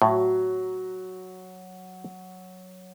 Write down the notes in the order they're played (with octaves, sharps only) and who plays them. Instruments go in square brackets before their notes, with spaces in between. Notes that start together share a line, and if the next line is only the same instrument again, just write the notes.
[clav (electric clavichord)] A2 [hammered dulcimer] F#3